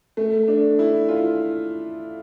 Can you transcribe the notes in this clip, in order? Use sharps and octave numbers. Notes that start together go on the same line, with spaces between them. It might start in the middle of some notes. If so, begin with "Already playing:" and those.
A3
D4
E4
F4